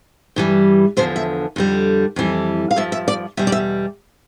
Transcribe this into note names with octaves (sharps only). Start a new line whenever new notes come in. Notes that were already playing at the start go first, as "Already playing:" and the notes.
G2 E3 G3
E2 D3 F3 C5
E5
F2 D3 G3
F2 E3 G3
F5
G2 F3 E5
E5
D5
E2 B2 G3 E5
D5
E5